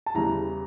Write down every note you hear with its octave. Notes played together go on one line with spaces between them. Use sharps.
A5
E2 C#3 E3 G3 A#5